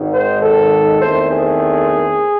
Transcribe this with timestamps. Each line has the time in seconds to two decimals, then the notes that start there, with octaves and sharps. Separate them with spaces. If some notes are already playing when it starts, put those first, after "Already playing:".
Already playing: G#1 G#2 D#3
0.13 C5
0.42 A4
1.01 E2 D#3 A3 C4 C5
1.30 G#4